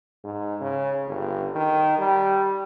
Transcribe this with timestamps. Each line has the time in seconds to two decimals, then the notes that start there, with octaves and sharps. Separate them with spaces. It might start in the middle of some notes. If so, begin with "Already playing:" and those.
0.24 G#2
0.61 C#3
1.07 G1
1.55 D#3
1.98 G3